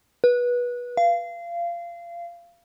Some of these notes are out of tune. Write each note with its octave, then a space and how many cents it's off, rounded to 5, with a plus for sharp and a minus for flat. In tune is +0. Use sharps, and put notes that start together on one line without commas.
B4 -20
F5 -25